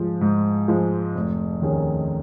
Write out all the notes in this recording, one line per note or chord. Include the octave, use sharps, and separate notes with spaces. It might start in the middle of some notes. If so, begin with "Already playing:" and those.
Already playing: G#2 F3 G#3
G#2
F3 G#3
F1
D#2 D#3 C#4 G#4